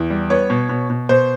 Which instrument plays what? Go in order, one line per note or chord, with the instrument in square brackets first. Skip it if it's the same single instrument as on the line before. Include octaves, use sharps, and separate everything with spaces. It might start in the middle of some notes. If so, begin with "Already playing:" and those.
Already playing: [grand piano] E2
G3
B3 C#5
B2
B2
B2
B2 C5